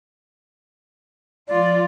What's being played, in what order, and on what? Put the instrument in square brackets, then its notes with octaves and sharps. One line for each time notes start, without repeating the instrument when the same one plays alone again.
[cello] F3 F4 [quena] D5